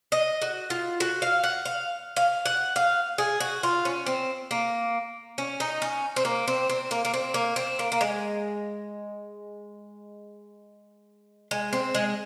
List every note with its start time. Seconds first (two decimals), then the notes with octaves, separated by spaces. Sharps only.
0.12 D#5
0.42 F#4
0.70 F4
1.00 F#4
1.22 F5
1.44 F#5
1.65 F5
2.16 F5
2.45 F#5
2.76 F5
3.18 G#4
3.40 F#4
3.63 F4
3.85 C#4
4.06 C4
4.51 A#3
5.38 C#4
5.60 D#4
5.82 C#4
6.16 C4
6.25 A#3
6.48 C4
6.70 C4
6.91 A#3
7.05 A#3
7.14 C4
7.34 A#3
7.56 C4
7.79 A#3
7.92 A#3
8.01 G#3
11.51 G#3
11.73 C4
11.95 G#3